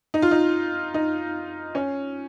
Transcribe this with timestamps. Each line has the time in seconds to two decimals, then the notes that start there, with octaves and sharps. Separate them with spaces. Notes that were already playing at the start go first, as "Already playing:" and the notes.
0.14 D#4
0.22 F4
0.31 D#4
0.94 D#4
1.75 C#4